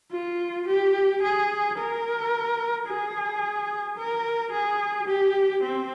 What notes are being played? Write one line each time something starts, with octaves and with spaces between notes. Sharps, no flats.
F4
G4
G#4
A#4
G#4
A#4
G#4
G4
C4